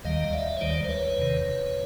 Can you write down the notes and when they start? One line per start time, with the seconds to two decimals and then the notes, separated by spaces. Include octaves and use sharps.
0.04 D#2 D#3 G3 D#5 F5
0.33 D5 E5
0.57 C#5
0.61 D#2 D#3 G3 C5 D5
0.84 C5
0.89 B4 C#5
1.17 E2 C3 D#3